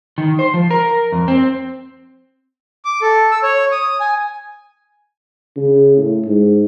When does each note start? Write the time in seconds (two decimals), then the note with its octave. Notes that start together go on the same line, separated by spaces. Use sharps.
0.18 D#3
0.39 C5
0.54 F3
0.71 A#4
1.12 F2
1.28 C4
2.85 D6
3.02 A4
3.31 E6
3.43 C#5
3.72 D#6
4.00 G#5
5.57 C#3
5.97 A2
6.26 G#2